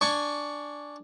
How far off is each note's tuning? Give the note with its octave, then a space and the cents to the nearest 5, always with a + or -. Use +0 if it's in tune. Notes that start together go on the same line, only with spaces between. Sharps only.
D4 +0 G#5 +0 C#6 +15